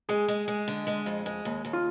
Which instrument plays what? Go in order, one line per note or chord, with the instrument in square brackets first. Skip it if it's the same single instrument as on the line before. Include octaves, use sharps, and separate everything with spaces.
[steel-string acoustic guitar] G#3 [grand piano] G#4
[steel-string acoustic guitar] G#3
G#3
D3
G#3
F2
G#3
D#2
D#2
[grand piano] F4